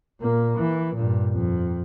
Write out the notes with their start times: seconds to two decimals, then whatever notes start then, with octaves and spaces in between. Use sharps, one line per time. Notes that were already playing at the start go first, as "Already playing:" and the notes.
0.20 A#2 A#3
0.57 E3
0.95 G2 A#2
1.34 F2